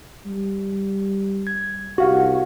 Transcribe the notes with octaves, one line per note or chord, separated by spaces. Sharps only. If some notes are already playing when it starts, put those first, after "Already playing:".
G3
G#6
C2 F#4 G4 F5 F#5